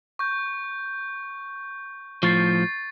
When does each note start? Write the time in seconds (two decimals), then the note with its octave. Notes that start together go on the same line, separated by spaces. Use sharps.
0.19 C#6 G6
2.23 A2 F3 C#6 A6 C7